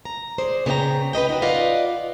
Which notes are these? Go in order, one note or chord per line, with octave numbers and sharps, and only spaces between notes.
A#5
G#4 C5 D5
C#3 B3 C#5 D5 G5 A#5
B4 C5 D#5 G5
D#4 F#4
F4 B4 D5 D#5 F5 F#5